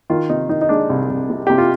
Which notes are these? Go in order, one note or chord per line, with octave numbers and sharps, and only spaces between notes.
D#3 F4
C3 D#4
D#3 D#4
D#4
G#3 D4
C2
C2
C3
C3 G4
F4